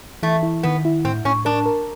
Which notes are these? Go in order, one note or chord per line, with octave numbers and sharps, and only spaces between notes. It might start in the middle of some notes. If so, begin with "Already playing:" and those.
E3 A3
E4
D#3 B3
E4
A2 C4
A2 C#4
D4 A#4
A#4